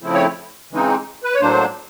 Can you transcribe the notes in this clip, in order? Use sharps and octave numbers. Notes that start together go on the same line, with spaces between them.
C#3 F3 A3 C4 E4
C#5
C#3 E3 G#3 C4 D#4
B4
C#5
A2 F#3 A#3 D4 C5